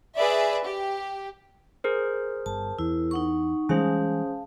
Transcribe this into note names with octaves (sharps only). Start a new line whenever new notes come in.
G#4 B4 D5 E5
G4
G#4 A#4 C5
G1 A5
E2 E4
D#4 F#5 C#6
E3 G3 G#3 C#4 G#4 C5 F5 A5